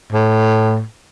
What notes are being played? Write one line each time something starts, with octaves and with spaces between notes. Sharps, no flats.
A2